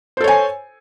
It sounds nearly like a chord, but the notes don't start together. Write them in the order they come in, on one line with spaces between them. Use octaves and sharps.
C5 A4 C#5 G#5